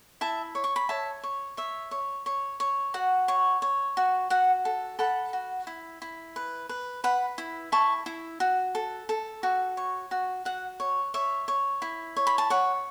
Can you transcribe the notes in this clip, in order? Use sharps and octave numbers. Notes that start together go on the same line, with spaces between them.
E4 E5 A5
C#5
C#6
B5
C#5 E5 A5
C#5
C#5 E5
C#5
C#5
C#5
F#4 F#5
C#5
C#5
F#4
F#4 F#5
A4
A4 F#5 B5
F#4
E4
E4
B4
B4
B4 F#5 B5
E4
E4 A5 C#6
E4
F#4
A4
A4
F#4
C#5
F#4
F#4 F#5
C#5
C#5 E5
C#5
E4
C#5
B5
A5
C#5 F#5